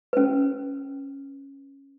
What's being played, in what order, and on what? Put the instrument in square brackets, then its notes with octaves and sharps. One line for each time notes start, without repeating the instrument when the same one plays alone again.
[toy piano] C#4 B4